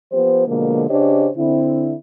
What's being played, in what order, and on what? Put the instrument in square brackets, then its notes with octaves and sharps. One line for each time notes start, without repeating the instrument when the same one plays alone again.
[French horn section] F3 B3 G4 C5
B2 D3 F3 G#3 A#3
C#3 D4 G4 C5 C#5 D#5
D3 C4 E4